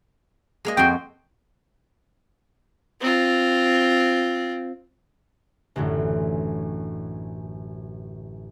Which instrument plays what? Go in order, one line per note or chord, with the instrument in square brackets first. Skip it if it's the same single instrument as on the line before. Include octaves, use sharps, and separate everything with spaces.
[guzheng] G#3 A#3 D#5
[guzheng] F2 F#4 C6 [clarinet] G5
[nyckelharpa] C4 F4
[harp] A1 F#2 A2 D3 E3